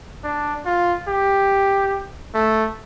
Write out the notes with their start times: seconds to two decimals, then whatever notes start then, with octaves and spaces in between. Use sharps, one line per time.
0.24 D4
0.66 F4
1.08 G4
2.34 A3